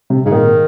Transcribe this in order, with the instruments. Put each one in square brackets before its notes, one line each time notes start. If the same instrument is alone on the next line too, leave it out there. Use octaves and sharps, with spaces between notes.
[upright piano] C3
[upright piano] G#2 [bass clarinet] C#3
[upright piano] A#2 [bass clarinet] D#3